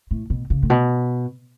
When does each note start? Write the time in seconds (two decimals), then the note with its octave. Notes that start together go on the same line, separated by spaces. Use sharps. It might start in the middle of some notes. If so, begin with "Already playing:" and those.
0.11 A2
0.30 B2
0.50 C#3
0.63 A2
0.70 B2